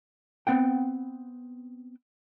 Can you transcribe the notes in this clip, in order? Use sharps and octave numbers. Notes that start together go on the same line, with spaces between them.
B3 C4 F#5 G5